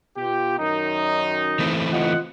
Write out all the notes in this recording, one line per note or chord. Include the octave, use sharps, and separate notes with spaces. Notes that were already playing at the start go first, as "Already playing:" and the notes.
B2 F4 G4
F#2 D#3 D#4
E3 A3 C4
F4 D#5 F#5